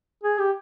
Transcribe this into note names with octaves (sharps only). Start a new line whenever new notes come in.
G#4
G4